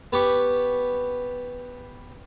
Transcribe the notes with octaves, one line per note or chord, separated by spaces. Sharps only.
B3 G4 C#6